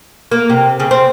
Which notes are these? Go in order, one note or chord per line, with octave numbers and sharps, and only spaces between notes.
A#3
C3
C#3
C4